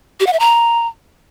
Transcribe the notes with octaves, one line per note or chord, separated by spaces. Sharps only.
G4
F#5
E5
A#5